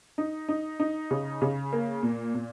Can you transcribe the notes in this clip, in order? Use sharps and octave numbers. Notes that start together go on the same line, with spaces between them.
D#4
D#4
D#4
C#3
C#3
A#3
A#2
A#2